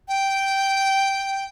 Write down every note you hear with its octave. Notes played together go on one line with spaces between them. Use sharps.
G5